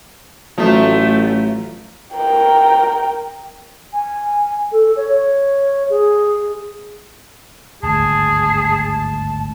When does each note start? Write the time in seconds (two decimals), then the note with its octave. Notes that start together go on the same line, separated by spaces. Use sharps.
0.58 A1 F3 F#3 A3
2.14 A#4 G5
3.93 G#5
4.72 A4
4.96 C#5
5.90 G#4
7.83 G#1 D2 G2 G#4 A5